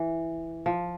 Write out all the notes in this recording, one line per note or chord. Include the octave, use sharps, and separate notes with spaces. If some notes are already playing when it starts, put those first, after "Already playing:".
Already playing: E3
F3